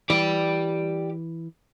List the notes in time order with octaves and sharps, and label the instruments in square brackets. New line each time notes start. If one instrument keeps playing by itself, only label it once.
[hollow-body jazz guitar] E3 [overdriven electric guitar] G4 D5